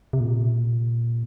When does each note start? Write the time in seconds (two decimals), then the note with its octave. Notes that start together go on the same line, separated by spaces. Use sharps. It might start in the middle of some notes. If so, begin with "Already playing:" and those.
0.13 C3
0.20 A#2